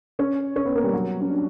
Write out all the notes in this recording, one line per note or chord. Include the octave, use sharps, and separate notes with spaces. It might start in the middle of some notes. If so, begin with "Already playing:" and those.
C#4 C#5
C#4 C#5
B3 B4
A#3 A#4
G3 G4
F#3 F#4
C#4
D4